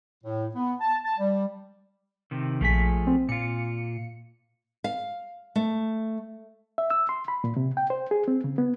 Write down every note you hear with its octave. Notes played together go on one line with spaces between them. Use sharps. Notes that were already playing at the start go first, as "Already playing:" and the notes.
A2
B3
A5
A5
G3
C3 D#3
A#1 F3 A3 G#4 B6
C4
A#2 F4 C#7
F5
A3
E5
E6
C6
B5
A#2
C3
G5
C5
G#4
C4
C#3
B3